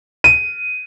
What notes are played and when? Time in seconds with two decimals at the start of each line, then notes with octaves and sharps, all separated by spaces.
0.24 D#7